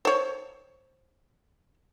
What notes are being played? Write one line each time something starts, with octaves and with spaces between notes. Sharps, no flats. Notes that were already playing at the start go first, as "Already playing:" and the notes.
C5 C#5